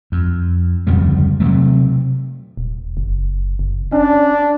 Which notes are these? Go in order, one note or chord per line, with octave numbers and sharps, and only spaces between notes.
F2
D1 F2 C#3 G3
C3 F3 F#3 A3
D#1
F#1
F#1
C#4 D4